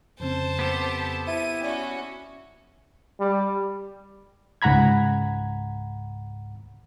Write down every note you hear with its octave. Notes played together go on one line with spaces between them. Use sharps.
F2 C#3 C4 C5 A5
B3 G4 A4
E4 D#7
C#4 F#4 D5 G5
G3
C#2 G#2 F#5 A#5 B5 G#6